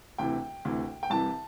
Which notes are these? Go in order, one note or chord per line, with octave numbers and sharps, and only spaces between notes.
D2 C3 E3 G5
D2 C3 E3
G5
C2 C3 E3 A5